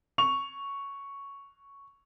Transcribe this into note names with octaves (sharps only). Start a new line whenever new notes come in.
C#6 F7